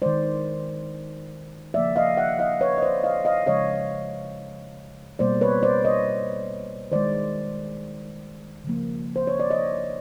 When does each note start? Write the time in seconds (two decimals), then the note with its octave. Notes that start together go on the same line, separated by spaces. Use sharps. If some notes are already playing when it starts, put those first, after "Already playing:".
0.02 D#3 G#3 C5 D5
1.74 C#3 F3 A#3 D5 E5
1.96 D#5 F5
2.17 E5 F#5
2.39 D#5 F5
2.61 B4 C#5
2.78 D#5
2.82 C5 D5
3.04 D#5 F5
3.25 D#5 F5
3.47 C#3 F3 G#3 C#5 D#5
5.19 B2 G3 A#3 C5 D5
5.41 B4 C#5
5.63 C5 D5
5.85 C#5 D#5
6.92 D#3 G#3 C5 D5
8.64 C#3 F3 A#3
9.16 C5
9.27 C#5
9.40 D5
9.51 C#5 D#5